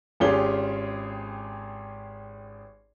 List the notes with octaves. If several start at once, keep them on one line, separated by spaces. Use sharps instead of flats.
G#1 C#4 F4 G4 G#4 G7